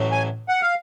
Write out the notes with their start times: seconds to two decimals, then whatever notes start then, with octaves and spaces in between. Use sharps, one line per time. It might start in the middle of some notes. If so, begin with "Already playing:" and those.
Already playing: A1 A2 F#3
0.12 G#5
0.49 F#5
0.62 F5